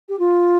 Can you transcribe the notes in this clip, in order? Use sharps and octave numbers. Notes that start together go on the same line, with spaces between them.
G4
F4